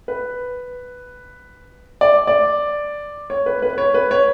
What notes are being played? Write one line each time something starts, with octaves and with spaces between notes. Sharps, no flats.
B4
D5
D5
C#5
B4
B4
B4
C#5
B4
C#5